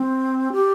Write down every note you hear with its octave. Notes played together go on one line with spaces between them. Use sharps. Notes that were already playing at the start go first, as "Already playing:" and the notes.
Already playing: C4
G4